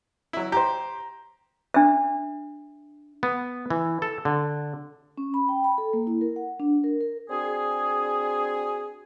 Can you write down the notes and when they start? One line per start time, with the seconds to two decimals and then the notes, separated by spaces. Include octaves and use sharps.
0.33 F#3 E4
0.52 G4 C5 A#5
1.74 D4 E5
3.23 B3
3.70 E3
4.02 A4
4.25 D3
5.18 C#4
5.34 B5
5.49 G5
5.64 B5
5.78 A4
5.93 A#3
6.07 E4
6.21 A#4
6.36 F#5
6.60 D4
6.84 A#4
7.01 A#4
7.30 C4 D4 F#4 G#4